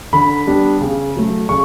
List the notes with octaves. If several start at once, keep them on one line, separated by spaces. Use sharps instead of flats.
D3 B5
G3 B3 D4
C#3
F#3 A3
C#3 C#6